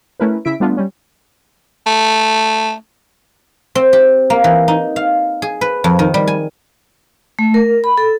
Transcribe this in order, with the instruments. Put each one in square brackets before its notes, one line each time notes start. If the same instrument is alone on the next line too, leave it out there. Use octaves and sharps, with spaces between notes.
[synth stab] A3 C#4 E4 A#4 B4
C#3 E4 E5 B6 D7
G3 A3 B3 D4 F4
G3 C#4
[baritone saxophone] A3
[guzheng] C4
G4
A#3
E3
D#4
F5
G#4
B4
F2
D#3
G3
G#5
[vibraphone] A3
A#4
B5
A4